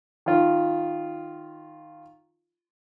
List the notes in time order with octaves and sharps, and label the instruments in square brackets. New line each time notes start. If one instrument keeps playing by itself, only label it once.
[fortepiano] D#3 F4